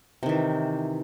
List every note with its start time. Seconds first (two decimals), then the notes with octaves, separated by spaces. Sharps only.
0.23 C3
0.26 D#3
0.29 E3